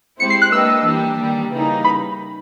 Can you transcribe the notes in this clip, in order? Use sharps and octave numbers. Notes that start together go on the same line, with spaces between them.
G#3 C4 E4 G4 C5 C#7
C7
F#6
A#3 D4 G4 B4 D#5 E6
E3 G3 A#3 D4 G4
D#3 G3 A#3
C#3 E3 G3 A#3 D#4
B5